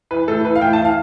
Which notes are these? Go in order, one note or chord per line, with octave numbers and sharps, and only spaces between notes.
E3 B4
A2 A4
E3 B4
F5
A2 G5
A5
E3
F5